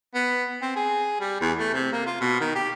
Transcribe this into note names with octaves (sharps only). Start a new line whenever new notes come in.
B3
C4
G#4
G3
E2
A3
C3
A#3
F4
B2
D#3
G4